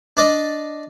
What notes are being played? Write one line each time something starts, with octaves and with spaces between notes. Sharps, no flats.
D4 D5 D#5